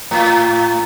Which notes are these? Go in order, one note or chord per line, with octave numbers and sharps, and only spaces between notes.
A2